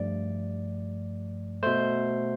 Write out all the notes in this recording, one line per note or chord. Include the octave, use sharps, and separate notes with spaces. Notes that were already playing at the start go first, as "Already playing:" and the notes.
Already playing: G2 F3 A3 D5
B2 A3 C5